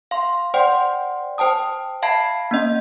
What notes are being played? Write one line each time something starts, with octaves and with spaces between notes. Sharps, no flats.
F5 C6
C5 D5 F#5 G5 C6
C5 G5 A5 D#6
E5 F5 A5 B5 G#6 C7
A#3 C#4 D#5